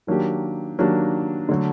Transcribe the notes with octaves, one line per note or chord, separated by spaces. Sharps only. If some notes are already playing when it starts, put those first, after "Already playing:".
D#3 F#3 A#3 D4 G4
D#3 F#3 A#3 D4 G4
D3 F#3 A3